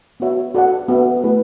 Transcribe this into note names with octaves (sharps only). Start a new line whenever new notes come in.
B3 F#4 C#5 E5
F#4 A4 D5 F#5
B3 F#4 A4 E5
A3 E4 G#4 B4